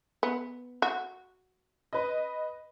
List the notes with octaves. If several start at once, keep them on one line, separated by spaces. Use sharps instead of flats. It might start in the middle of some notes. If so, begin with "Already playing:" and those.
B3
F#4
B4 D#5